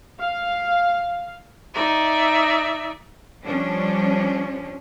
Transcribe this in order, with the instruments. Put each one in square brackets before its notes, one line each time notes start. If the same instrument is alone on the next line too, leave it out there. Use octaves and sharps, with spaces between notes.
[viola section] F5
[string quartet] D#4 D5 E5
[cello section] F3 G3 C#4 D4